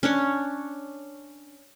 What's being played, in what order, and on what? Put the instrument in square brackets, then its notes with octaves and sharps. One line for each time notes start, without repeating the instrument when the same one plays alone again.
[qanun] C#4 D4 C#5